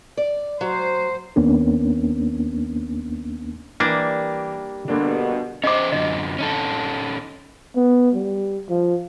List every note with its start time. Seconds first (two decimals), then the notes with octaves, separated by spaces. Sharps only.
0.17 D5
0.61 F#3 C5
1.36 D#2 A#3 B3 C#4 D4
3.80 E3 G3 A#3 D4 A#4
4.88 G2 B2 D3 A#3 D4
5.64 C#4 G#4 C5 D#5 D6
5.92 F#2 D3 D#5
6.39 C#4 D#4 A4
7.76 B3
8.15 G3
8.69 F3